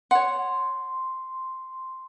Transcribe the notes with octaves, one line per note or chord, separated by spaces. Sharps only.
C#5 F#5 C6